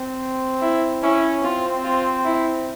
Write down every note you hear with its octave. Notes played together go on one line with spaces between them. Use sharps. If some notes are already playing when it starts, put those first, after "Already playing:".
Already playing: C4
E4
C#4 E4
C4 F4
F4
E4